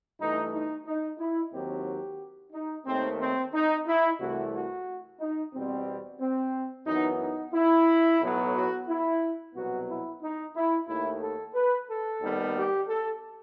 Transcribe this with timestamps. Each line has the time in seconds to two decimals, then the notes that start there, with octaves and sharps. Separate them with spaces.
0.19 G2 E3 A3 D#4
0.52 D#4
0.86 D#4
1.18 E4
1.52 D#2 D#3 F#3 C4 G4
2.52 D#4
2.85 D#2 D#3 A3 C4
3.19 C4
3.53 D#4
3.86 E4
4.19 C2 C3 E3 A3 F#4
4.53 F#4
5.19 D#4
5.53 E2 B2 G3 C4
6.20 C4
6.86 F#2 E3 B3 D#4
7.20 D#4
7.53 E4
8.20 B1 A2 F#3 B3
8.54 F#4
8.87 E4
9.54 C2 B2 F#3 B3 F#4
9.88 E4
10.21 D#4
10.54 E4
10.87 D#2 D#3 A3 E4
11.21 A4
11.54 B4
11.88 A4
12.21 D#2 D#3 G3 B3
12.55 G4
12.88 A4